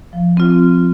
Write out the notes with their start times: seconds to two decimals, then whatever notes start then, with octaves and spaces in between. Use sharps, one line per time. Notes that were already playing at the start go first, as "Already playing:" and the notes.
0.13 F3
0.37 C4 F4